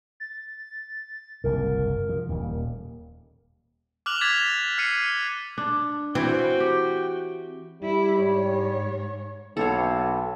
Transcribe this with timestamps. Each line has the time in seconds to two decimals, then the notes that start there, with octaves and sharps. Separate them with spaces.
0.20 A6
1.44 F#1 C2 G#2 A#4
2.09 F3
2.29 D#1 D#2
4.06 D6 F6 F#6 F7 F#7
4.21 D6 G#6 A6 B6 E7 F7
4.78 F6 C7 C#7 D#7
5.58 D4
6.15 E3 C4 E4 F#4 C#5 G5
6.60 G4
7.83 G3 E4
8.18 G#2 C#5
9.57 B1 A4 C#5 F5